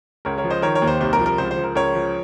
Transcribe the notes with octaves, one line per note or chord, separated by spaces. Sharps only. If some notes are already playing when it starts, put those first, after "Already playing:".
C#2 A#4 C#5
A#4 C#5
F3
C5 D#5
D#3 A#4 C#5
A#4 C#5
D#2
C5
C2 C5
A#4
F3
A#4
C#2 C5
C5
F3
A#4
C#2 A#4 C#5
F3